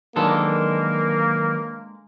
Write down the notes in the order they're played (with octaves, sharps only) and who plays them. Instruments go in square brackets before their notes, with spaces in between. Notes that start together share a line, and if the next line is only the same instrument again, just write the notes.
[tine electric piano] D#3 F#3 B4 [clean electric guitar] G#3 D4 A4 [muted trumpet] A#3